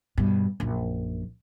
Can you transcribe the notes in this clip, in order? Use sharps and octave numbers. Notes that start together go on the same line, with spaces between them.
G2 B2
A#1 F#2